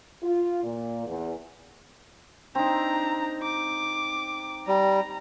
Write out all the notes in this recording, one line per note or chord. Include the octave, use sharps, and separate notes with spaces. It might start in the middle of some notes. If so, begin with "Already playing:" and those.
F4
A#2
E2
C4 D4 D#4 A#5
D6
G3 A#5